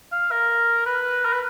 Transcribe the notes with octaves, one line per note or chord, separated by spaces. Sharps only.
F5
A#4
B4
A#4
B4